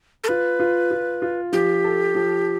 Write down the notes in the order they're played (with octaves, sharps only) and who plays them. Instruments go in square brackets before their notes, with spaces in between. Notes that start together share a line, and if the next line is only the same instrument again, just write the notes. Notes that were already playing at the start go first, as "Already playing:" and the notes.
[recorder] A4
[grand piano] F4 [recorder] B4
[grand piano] F4
F4
F4
[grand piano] F3 [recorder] G4
[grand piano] A4
F3